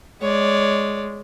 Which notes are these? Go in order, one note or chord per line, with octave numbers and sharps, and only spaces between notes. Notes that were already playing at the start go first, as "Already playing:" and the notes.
G#3 C#5 D5